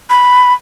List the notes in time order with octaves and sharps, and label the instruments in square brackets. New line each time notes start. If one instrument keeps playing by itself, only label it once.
[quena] B5